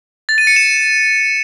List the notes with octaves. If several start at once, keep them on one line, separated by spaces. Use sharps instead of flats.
A6
D#7
C#7
E7